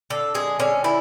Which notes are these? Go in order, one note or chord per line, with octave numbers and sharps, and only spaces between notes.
D3 A4
G#3 G#4
D3 C#4
D3 E4